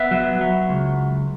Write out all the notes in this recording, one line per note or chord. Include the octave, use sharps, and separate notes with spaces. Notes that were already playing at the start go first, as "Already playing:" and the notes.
Already playing: B3 E5
F#3
F#3
C#2